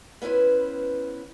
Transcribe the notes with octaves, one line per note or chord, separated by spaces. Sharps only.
B3 C#4 E4 B4 C5